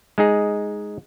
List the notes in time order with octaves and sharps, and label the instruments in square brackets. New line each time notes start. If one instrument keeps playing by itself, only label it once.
[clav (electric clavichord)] G#3 D#4 G#4